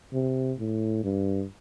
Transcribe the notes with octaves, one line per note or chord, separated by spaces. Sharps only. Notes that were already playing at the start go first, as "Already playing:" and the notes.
C3
A2
G2